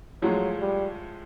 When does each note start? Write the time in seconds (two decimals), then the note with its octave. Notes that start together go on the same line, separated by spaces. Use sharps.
0.22 A2 F3 F#3 G#3
0.60 G3